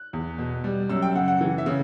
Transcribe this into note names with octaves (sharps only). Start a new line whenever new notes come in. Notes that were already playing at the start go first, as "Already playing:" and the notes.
Already playing: F#6
E2
B2
G3
F#2 E6
G5
C#3 F#5
F#5
E3
E5
C#3